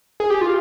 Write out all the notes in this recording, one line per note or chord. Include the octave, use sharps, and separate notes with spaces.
G#4
G4
F4